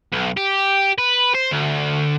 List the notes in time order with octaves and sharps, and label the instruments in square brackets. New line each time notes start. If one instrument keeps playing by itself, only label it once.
[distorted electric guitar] B1
G4
B4
C5
D2